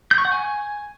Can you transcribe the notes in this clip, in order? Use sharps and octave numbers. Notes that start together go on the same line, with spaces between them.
G6
C#6
F#5
G#5